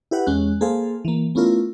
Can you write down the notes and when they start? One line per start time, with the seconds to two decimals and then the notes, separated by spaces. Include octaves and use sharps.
0.11 E4 G4 B4 F#5
0.26 E2 G#3 C#4 F#6
0.61 A#3 G#4 A4 C5 F5
1.05 E3 A#3
1.35 A3 B3 C#4 E4 F4 A#4